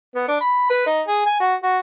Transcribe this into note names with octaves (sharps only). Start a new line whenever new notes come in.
B3
D4
B5
B4
D#4
G#4
G#5
F#4
F#4